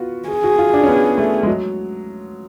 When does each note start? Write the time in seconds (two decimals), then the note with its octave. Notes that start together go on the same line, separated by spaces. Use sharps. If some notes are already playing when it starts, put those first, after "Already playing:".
Already playing: B3 F4 F#4
0.29 G#4
0.44 F#4
0.58 F4
0.74 D4
0.83 C#4
0.88 B3
1.18 A3
1.43 G#3
1.47 F#3